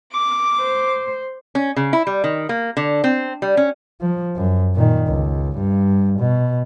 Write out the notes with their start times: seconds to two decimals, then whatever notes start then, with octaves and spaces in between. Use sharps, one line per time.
0.12 D6
0.60 C5
1.55 C#4
1.76 C#3
1.93 E4
2.07 G3
2.24 D#3
2.49 A#3
2.77 D3
3.04 C4
3.42 G3
3.57 C#4
4.01 F3
4.36 F#2
4.75 A#2 D#3
5.07 C#2
5.57 G2
6.19 B2